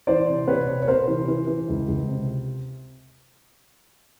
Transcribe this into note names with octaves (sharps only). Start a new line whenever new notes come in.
E3 C5 D5
C3
C3 B4 C#5
C3
C#5
C3 A#4 C5
E3
E3
E3
C#2
C#2
C3